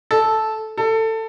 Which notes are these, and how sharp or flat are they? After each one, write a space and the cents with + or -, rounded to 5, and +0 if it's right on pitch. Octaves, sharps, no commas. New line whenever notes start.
A4 -10
A4 +20